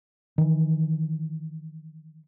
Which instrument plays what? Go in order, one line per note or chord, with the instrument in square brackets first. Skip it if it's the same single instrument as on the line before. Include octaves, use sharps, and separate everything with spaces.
[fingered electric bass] D#3 E3